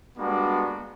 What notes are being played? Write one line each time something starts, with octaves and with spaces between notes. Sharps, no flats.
G3 G#3 A#3 B3 D4 F#4